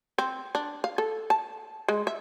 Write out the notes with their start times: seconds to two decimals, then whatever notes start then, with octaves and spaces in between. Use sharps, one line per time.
0.18 C4
0.55 D4
0.84 F5
0.98 A4
1.30 A5
1.88 G#3
2.07 E5